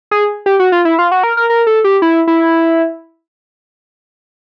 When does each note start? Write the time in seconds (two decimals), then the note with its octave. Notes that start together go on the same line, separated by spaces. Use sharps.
0.11 G#4
0.46 G4
0.60 F#4
0.72 F4
0.85 E4
0.99 F4
1.11 F#4
1.24 A#4
1.37 A#4
1.50 A#4
1.67 A4
1.84 G4
2.02 E4
2.27 E4